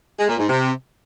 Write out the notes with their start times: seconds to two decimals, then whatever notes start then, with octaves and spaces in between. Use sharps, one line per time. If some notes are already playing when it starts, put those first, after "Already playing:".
0.18 G#3
0.28 A#2
0.38 G#2
0.48 C3